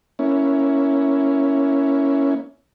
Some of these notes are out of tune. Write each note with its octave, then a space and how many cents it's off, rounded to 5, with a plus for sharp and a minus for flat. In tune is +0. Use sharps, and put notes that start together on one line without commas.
A#3 +0 C#4 +5 E4 +0